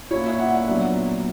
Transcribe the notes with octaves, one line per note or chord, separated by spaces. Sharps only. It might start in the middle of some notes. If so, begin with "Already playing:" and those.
A#2 A#3 C#4 E4 C#5
E5
F#5
E5
A#2 F#3 B3 D4